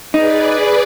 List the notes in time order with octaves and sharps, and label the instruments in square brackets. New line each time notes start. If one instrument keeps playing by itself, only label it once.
[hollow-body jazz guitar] D#4 [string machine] G#4 B4 D5